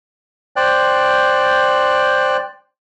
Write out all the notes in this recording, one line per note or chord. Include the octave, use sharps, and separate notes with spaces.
C5 D5 G5 F#6